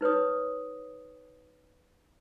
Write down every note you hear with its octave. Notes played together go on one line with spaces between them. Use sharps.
D#4 B4 C#5 D#6